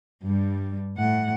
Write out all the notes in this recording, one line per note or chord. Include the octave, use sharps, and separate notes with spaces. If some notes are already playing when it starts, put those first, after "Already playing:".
G2 G3
A2 F#5